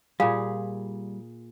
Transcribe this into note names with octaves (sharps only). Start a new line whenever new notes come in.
A#2 G3 G#4 F5